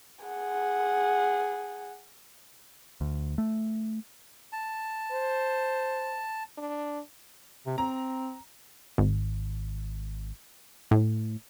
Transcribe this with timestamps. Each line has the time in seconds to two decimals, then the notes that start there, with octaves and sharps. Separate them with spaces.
0.25 G#4 F#5
3.01 D2
3.38 A3
4.52 A5
5.12 C5
6.58 D4
7.67 C3
7.78 C4 A#5
8.98 G#1
10.91 A2